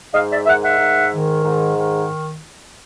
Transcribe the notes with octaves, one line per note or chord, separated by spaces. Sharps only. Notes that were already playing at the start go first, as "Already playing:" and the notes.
G#2 D#5 F5
D5 E5
D#3 E5 F#5
E5 F#5
G#2
D#3
G#2
D#3